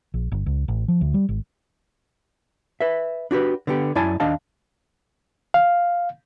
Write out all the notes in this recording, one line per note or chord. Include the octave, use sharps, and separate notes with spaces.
A#1
G1
C#2
A1
F3
D2
G3
G#1
B4 E5
D4 F#4 G4 B4
D3 B3 G4
F#2 E4 D5 G#5 A5
D#2 D4 D#5 F5 A5
F5